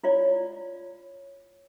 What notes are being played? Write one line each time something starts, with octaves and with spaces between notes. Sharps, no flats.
E4 F4 C#5 D5